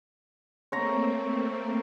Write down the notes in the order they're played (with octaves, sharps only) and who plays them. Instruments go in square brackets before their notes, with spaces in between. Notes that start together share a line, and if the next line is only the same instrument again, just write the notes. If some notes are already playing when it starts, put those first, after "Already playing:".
[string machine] A3 A#3 C4 [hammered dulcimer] C#5 A#5